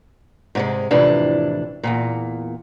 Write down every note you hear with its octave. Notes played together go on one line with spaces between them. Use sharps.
G#2 C3 G#3
F2 A2 C3 E3 D4
E2 G2 A#2